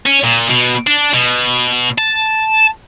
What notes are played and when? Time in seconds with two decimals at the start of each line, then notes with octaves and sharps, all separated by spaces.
0.06 C#4
0.24 A#2
0.50 B2
0.87 D4
1.14 B2
1.98 A5